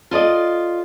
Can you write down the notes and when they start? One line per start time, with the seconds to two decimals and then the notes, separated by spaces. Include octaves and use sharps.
0.11 F4 A4 D5 D#5